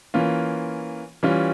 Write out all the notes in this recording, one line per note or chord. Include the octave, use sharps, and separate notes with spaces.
E3 A#3 C#4 F4
E3 G3 C#4 F4